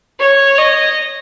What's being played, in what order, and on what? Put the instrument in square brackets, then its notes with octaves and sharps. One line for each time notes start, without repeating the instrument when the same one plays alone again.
[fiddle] C#5
D#5